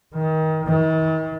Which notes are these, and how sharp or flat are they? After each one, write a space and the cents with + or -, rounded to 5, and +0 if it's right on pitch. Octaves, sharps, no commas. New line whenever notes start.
D#3 +30
D#3 +45